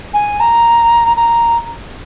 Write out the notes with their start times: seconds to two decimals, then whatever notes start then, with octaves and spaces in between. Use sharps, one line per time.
0.14 G#5
0.40 A#5
1.17 A#5